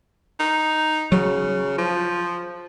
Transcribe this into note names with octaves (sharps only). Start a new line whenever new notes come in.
D#4
C#3 F#3
F3